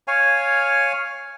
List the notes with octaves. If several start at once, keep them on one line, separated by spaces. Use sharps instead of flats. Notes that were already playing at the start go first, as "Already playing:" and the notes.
C#5 F5 G#5